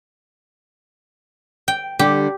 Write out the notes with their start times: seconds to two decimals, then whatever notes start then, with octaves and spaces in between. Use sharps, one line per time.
1.68 G5
1.99 D3 G3 G4